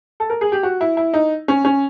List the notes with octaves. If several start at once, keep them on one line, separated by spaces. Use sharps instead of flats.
A4
A#4
G#4
G4
F#4
E4
E4
D#4
C#4
C#4